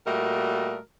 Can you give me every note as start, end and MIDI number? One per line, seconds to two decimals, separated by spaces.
0.07 0.78 46
0.07 0.78 55
0.07 0.78 57
0.07 0.78 66
0.07 0.78 70
0.07 0.78 75